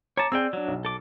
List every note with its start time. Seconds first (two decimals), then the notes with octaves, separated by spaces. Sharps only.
0.17 C#5 A5 A#5 D6
0.32 C4 G#4 D5 G5 E6
0.53 F#3 D4
0.68 B1
0.85 A4 D6